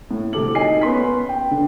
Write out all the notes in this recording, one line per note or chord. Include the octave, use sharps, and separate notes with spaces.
A2
D2 C3 A4 D6 F#7
D#4 G#5 C7
B3 C#4 C6 B6
G5
D3